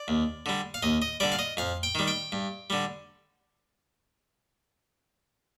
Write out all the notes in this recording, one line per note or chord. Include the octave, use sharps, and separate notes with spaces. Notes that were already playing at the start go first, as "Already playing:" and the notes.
Already playing: D5
D#2
D3 G3
F5
D#2 D#5
D#5
D3 G3 D5
F5
D#5
F2 F5
G5
D#3 G3
G5
G2
D3 G3